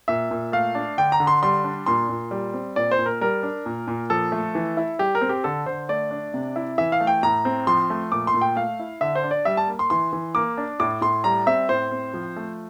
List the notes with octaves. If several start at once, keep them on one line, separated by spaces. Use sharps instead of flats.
A#2 E5
A#2
A3 F5
D4
D3 G5
A#5
D3
C6
G3 C6
D4
A#2 C6
A#2
G3
C4
A#2 D5
C5
A#2
A#4
G3 A#4
D4
A#2
A#2
F3 A4
A3
E3
E4
G3 G4
A#4
C4
G4
D3 A4
D3 C5
A3 D5
D4
C3
E4
E3 E5
F5
A3
G5
A2 A#5
C4
F3 C6
A3
A#2 D6
C6
A#2
G5
A3 F5
E4
D3 E5
C5
D4
D5
G3 E5
A5
A#3
C6
E3 C6
E3
A#3 D6
D4
A2 D6
A2 C6
G3 A#5
C4 E5
A2 C5
C4
F3
A3